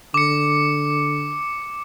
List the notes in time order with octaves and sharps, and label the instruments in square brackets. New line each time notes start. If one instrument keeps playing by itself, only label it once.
[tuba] D3 [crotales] D6 C#7